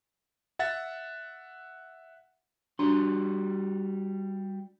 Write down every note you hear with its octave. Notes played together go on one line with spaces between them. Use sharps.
E5 F#5 A6
G3 D4 F#4 C6